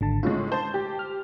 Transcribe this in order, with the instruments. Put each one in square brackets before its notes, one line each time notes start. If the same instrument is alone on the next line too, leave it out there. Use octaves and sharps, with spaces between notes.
[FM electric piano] G#1 D3 A5
[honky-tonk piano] A2 C#3 G#3 [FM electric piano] F4
[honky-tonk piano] C5 [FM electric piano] A5 G6
[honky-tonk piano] G4
[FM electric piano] F6